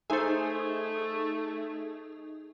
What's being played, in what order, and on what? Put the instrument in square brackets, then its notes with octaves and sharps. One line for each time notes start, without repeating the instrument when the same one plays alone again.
[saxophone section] A3 [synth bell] D#4 G#4 [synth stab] A4 G#5 [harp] C5 E5